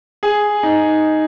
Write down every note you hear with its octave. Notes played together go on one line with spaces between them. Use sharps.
G#4
D#4